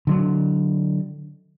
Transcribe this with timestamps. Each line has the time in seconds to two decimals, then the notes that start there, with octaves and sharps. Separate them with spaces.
0.07 D3 F#3 D4